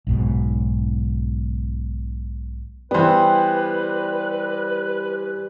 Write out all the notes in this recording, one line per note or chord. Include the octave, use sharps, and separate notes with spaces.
B1 G#2 B2
E3 G3 B3 B4 C5